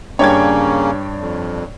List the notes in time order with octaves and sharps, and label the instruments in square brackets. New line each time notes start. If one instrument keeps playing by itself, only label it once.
[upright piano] G2 D4 [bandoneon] C#3 A#3 C#4 [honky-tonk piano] C#5 G5 G#6
[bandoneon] F2